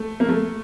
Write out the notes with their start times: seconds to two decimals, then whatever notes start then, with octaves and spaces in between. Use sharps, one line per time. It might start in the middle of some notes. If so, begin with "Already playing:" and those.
Already playing: A3
0.20 A#3
0.29 A3